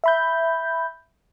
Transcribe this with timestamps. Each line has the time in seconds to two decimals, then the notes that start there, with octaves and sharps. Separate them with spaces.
0.04 E5 B5 G6